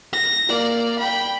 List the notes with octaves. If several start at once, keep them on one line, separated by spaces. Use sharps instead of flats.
A#6
A#3 D5
G5 B5